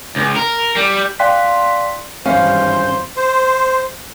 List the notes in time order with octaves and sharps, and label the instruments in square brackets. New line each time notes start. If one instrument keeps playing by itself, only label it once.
[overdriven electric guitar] C#2
A#4
G3
[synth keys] D5 F5 G5 C6 F#6 B6
[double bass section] G#1 G2 E3 [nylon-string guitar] C#4 [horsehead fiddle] C5 [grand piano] F5
[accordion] C5